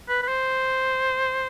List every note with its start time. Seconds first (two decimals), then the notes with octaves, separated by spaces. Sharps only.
0.09 B4
0.22 B4
0.28 C5